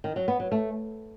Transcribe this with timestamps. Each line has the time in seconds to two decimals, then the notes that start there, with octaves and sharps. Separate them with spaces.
0.04 D#3
0.16 F#3
0.28 B3
0.40 F#3
0.52 A3